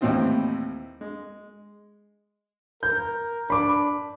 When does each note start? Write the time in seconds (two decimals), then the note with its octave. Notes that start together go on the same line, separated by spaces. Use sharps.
0.01 D#2 A2 E3 C4 E4 D#5
1.01 G#3
2.83 A#4 G6
3.50 D4 B5 D6